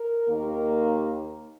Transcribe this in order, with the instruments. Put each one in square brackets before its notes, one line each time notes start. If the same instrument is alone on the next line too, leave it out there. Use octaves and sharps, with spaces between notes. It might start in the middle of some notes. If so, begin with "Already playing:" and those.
Already playing: [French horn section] A#4
D#2 D#3 A#3